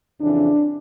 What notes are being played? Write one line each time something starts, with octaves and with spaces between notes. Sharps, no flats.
F2 C#3 E3 D4